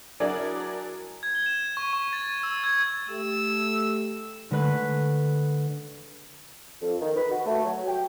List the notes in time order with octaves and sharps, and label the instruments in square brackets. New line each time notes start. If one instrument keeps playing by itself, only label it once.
[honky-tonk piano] F#3 D4 E4 G#4 A#4 D5
[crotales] G#6
G7
E7
C#6
C#6
A6
E6
G#6
[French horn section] A3 G4 [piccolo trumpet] E6
[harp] D3 G#3 A3 B4 F#6 B6
[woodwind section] F2
D#3
B4
F#4
A3
F#3
G5